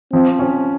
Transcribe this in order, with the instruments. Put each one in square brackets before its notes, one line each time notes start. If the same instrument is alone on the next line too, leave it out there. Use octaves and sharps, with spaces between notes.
[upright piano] F3 [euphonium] C4
[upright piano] C#4